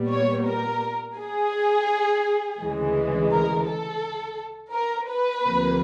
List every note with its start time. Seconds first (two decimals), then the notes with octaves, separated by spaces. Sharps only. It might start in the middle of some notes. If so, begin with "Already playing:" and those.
Already playing: A#2 G3 B3
0.11 C#5
0.46 A#4
1.17 G#4
2.61 D2 C#3 E3 G#3
3.31 A#4
3.67 A4
4.73 A#4
5.09 B4
5.44 D2 C3 F3 A#3